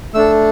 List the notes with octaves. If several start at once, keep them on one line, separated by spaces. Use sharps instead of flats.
A3 D4 A4 E6